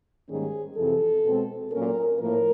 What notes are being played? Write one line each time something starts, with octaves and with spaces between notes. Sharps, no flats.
G#2 D#3 G3 A#3 C#4 G#4
F2 C3 E3 A4
B2 G#3 C4
A#2 F#3 A#3 C#4 A#4
A2 F3 A#3 A#4